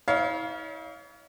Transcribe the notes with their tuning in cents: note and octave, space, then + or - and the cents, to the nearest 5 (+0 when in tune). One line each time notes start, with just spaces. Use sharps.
E4 -45 C#5 +40 F5 +0